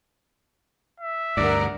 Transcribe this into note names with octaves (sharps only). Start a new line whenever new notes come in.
E5
D2 G2 A#4 D5 F#5